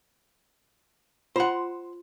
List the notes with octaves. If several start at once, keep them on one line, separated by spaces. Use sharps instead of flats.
F4 C5 F#5 C6